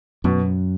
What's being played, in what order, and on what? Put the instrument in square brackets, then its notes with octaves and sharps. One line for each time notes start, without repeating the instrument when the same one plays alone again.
[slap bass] F#2 [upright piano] B2